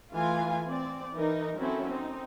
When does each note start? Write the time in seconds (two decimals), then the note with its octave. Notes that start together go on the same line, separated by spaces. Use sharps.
0.12 E3 A3 F4 F5 G#5
0.67 C4 D5
1.13 E3 D#4 A#4
1.58 F#3 C4 C#4 E4 A4
1.89 C4 D#4